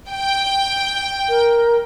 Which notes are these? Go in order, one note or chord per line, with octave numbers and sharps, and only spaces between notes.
G5
A#4